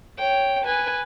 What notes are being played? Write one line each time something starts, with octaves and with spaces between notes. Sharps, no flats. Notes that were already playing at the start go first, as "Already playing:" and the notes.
C#5 G5
B4 G#5